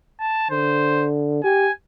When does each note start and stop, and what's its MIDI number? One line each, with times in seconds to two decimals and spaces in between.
0.20 0.49 81
0.50 1.41 50
0.50 1.07 72
1.44 1.69 67
1.44 1.72 80